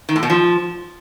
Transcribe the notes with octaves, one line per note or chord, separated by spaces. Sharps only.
D#3
A2
B2
F3